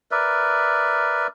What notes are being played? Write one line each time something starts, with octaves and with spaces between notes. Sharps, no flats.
A#4 B4 D5 E5